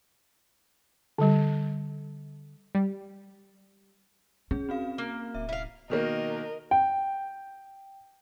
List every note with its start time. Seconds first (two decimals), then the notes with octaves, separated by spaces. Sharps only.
1.18 D3 G3
2.75 G3
4.51 C#4 G#4
4.69 C4 F#4 F5
4.98 A#3
5.35 D1 E5
5.49 E4 F5
5.90 B2 D#3 A#3 A#4 D#5
6.71 G5